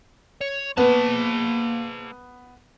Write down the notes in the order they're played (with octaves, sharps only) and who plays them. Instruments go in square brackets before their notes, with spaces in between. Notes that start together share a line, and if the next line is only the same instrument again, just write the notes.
[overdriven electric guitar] C#5
[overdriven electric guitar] A#3 A5 [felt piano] B3